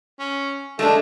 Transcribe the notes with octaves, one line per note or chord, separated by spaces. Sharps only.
C#4
G#3 A3 D4